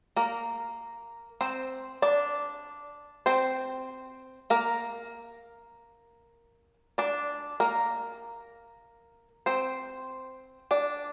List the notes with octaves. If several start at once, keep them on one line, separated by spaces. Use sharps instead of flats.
A#3 A#4
C4 C5
D4 D5
C4 C5
A#3 A#4
D4 D5
A#3 A#4
C4 C5
D4 D5